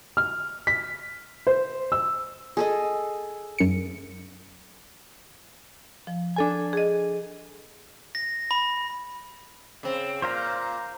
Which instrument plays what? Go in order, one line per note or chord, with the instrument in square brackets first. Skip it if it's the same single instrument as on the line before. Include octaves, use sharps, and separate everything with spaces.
[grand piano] F6
B6
C5
E6
[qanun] G#4 A4 D#5
[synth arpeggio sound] F#2 C#7
[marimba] F3
[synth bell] D4 A4 G#5
[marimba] G#4 D#5
[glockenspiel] A#6
B5
[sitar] C#3 C4
[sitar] A#2 [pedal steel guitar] C5 F5 A#5